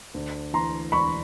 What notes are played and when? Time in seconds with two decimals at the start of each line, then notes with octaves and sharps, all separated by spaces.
0.14 D2
0.54 E3 A#5 C6
0.92 E1 B5 C#6